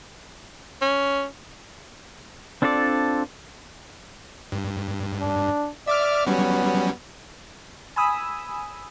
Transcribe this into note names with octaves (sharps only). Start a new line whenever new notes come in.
C#4
C4 D4 F4 A4 D5
G2
D4
D5 E5 D6 F6
F#3 G3 B3 C#4
G#5 B5 D#6 E6